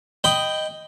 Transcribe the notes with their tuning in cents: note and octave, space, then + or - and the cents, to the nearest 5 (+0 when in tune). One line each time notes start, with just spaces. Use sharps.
D#5 +0 G5 +0 B5 +15